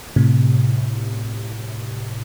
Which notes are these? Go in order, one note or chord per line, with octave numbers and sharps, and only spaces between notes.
A2 C3